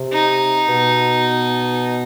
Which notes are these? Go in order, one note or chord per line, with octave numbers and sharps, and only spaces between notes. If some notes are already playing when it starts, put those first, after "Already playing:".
Already playing: C3
D#4
B2